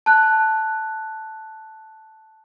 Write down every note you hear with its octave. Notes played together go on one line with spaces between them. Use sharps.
A5 F#6